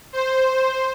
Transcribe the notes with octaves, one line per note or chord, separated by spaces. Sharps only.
C5